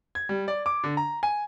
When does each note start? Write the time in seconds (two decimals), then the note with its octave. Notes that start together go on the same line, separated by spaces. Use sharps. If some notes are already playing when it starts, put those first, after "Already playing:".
0.15 G#6
0.29 G3
0.48 D5
0.66 D6
0.84 D3
0.97 A#5
1.23 G#5